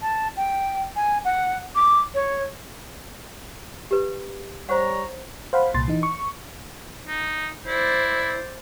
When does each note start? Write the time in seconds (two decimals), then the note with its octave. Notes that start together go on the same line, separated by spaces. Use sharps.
0.02 A5
0.37 G5
0.96 G#5
1.25 F#5
1.75 D6
2.15 C#5
3.91 G4 B4
4.69 G3 C5 C#5 F#5 A#5
5.53 C5 F5 F#5 B5
5.74 C2 A#2 C6 A6
5.88 E3 D#4
6.03 C#6
7.07 D#4
7.67 E4 C5 D5